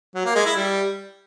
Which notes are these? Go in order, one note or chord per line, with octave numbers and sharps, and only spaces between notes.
F#3
A#3
G#3
E4
G3